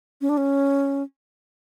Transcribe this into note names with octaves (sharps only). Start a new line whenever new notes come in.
C#4
D4
C#4